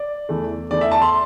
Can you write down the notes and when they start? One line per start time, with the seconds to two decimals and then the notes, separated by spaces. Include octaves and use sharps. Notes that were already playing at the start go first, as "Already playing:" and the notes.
Already playing: D5
0.29 E2 E3 A3
0.71 E2 E3 A3 D5
0.81 E5
0.92 A5
1.02 C6